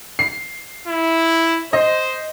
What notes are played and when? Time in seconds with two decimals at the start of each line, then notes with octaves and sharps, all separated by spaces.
0.19 C7
0.88 E4
1.73 C5 D#5